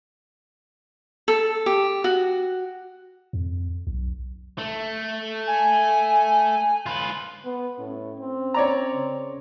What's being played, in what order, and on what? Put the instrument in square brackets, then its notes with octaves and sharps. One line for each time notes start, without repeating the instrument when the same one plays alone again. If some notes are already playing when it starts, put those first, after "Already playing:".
[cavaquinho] A4
G4
F#4
[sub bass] F2
B1
[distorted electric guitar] A3
[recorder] G#5
[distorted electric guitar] F4 B4
[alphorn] B3
[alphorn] A2 [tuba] C#4
[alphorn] C4
[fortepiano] C#5 D5 A#5
[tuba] C#3